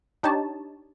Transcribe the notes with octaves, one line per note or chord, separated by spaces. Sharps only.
D4 D#4 G4 C#5 A5